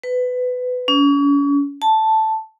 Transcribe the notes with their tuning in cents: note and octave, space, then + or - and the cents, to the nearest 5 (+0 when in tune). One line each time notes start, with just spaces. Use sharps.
B4 +20
C#4 +35
A5 +0